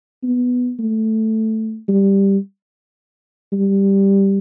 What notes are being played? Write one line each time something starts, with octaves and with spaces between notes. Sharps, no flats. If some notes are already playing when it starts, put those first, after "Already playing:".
B3
A3
G3
G3